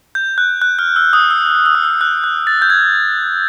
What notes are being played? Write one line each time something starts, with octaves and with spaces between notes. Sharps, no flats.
G6
F#6
F#6
F6
E6
D#6
E6
E6
D#6
E6
F#6
F#6
A6
G6
G#6